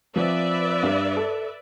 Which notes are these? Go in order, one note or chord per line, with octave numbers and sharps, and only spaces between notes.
F3 C4 B4 D5 E5
G2
A4